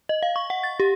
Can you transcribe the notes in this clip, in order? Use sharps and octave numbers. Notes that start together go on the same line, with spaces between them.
D#5
F5
C#6
F#5
A6
G4